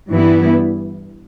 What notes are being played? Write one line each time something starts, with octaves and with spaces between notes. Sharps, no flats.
G2 E3 G3 B3 E4